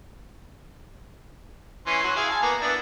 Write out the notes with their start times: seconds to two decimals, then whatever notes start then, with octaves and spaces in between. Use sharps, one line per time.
1.87 E3 C#4 C6
2.04 F#3 F#4
2.16 E4 G#4 F5
2.31 G#5 A5
2.42 A#3 B3
2.61 B3 D4 E4